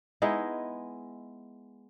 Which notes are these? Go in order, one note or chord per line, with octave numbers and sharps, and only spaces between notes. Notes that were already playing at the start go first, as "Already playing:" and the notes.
G#3 B3 D#4 E4